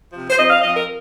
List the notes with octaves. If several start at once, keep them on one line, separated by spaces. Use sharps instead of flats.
C3 F3
C5
F2 D#5
F5
F3 C4 D#5
A#4